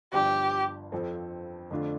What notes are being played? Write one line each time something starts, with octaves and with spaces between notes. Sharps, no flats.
G1 G2 F3 D4 G4
F2 F3 C4 A4
F2 D3 A3 D4 F4